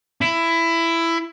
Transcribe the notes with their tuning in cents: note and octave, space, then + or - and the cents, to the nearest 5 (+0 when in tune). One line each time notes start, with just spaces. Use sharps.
E4 +15